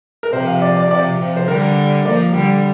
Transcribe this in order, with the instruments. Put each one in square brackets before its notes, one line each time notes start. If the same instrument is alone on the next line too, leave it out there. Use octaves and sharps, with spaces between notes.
[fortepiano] A#4
[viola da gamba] C3 F3 [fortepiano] C5
[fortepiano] F5
D5
D5
[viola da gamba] C3 F3 [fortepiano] D5
[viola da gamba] C3 F3
[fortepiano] C5
[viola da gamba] D3 G3 [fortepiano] A#4
[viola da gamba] F3 A#3 [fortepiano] D5
[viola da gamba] D3 G3